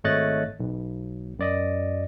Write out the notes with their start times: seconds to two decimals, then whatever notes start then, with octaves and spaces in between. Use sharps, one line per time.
0.04 G#1 A3 C#5 D#5 F#6 A6
0.60 B1
1.39 F#2 D5 D#5